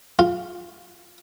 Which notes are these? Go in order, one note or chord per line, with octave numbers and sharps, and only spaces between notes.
F4